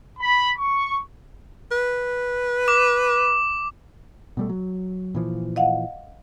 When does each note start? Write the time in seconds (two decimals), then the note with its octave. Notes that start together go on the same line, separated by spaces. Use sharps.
0.19 B5
0.58 C#6
1.72 B4
2.68 D6
4.37 B2 G3 A3
4.49 F#3
5.15 A#2 E3 F3
5.56 D#5 F5 F#5